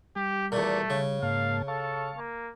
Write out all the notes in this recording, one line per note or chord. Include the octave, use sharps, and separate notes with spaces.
G3 G4
E2 A#2 A3
C#3
G#2 A#3 F5 A5
A4 F5 A5 C#6
A#3